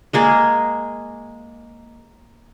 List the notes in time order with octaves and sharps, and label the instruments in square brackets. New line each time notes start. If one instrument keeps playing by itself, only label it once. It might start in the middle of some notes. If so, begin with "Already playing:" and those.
[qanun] G#3 A#3 G#4